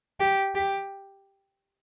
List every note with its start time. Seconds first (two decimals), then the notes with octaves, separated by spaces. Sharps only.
0.20 G4
0.55 G4